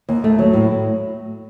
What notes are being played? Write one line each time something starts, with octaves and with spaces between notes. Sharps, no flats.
D#2
A3
F#3
A2